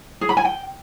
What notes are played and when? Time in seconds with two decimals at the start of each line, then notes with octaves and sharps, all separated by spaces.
0.21 G#4
0.29 B5
0.37 G#5
0.44 G5